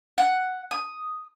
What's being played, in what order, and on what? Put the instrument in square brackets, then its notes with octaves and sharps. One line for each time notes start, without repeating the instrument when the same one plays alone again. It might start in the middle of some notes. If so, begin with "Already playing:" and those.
[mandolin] F#5
D#6